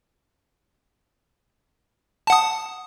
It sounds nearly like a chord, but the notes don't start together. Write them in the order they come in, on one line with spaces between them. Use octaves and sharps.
A5 F#5 D#6